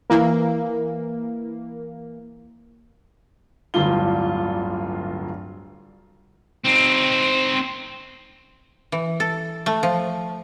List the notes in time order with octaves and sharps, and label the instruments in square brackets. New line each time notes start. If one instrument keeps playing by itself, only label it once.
[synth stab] E3 A#3
[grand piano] D1 G1 G2 D4 F4 G7
[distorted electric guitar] C4 D#4
[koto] E3
A4
A3
F3